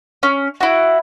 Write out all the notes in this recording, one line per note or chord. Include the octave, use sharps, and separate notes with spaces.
C#4
E4 F#4